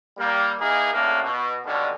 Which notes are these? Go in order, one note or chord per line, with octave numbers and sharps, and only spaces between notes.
G3 A#3
E3 A#3 D#4 G#4 A#4
F#2 A2 C#3 A#3 D4
B2
D#2 B2 D3 D#3 G#3